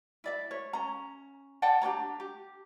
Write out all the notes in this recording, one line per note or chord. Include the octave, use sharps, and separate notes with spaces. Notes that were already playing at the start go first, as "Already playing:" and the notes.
E4 D5 E5
C#5
C#4 A#5
D5 F#5 G5 A5
D4 G4 C#5 A#5
G4